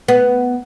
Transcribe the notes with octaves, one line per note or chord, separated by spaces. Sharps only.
B3